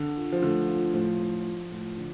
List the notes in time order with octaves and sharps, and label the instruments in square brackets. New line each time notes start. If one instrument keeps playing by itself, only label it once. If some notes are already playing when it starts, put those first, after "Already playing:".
Already playing: [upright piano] D3
[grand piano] F4
[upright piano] F3
[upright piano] D3 [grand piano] A3
[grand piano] F4
[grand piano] A2 [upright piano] F3
[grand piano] A2
F4
A2
D3